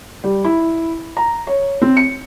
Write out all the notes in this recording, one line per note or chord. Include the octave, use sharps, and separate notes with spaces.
G3
E4
A#5
C#5
C4
C#7